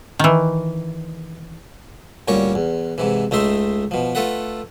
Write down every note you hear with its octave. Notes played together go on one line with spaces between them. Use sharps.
D#3 E3
D2 A#2 G3 C#4 A#4 C#6
E2
G#2 C3 E3
C#2 A3 D#4 E5 C6
B2 F3
A3 F4 A4 B4 F#5